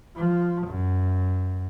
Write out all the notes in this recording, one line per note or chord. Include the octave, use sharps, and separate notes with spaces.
F3
F#2